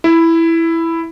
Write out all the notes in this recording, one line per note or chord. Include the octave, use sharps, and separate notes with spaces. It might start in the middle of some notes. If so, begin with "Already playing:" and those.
E4